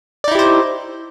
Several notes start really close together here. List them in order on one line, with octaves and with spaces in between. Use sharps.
D5 D#4 E4 G4 C5